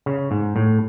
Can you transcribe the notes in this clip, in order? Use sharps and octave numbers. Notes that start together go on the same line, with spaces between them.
C#3
G#2
A2